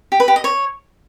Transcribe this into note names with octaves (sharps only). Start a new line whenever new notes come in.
G4
B4
G4
D#5
C#5